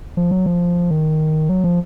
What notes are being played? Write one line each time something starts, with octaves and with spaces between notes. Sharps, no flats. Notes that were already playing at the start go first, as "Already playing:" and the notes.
F3
F#3
F3
D#3
F#3
F3